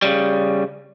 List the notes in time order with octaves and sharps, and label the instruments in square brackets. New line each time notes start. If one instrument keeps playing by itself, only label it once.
[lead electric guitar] C#3 G3